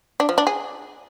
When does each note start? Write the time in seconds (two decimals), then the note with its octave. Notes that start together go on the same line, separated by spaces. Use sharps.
0.20 D4
0.29 F3
0.38 D4
0.47 G#4